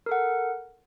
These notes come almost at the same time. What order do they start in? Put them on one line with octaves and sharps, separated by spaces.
A#4 A4 F#5